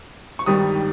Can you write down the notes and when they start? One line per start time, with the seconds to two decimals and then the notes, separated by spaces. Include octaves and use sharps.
0.39 C#6
0.46 G#1 G2 D#3 G3 D#6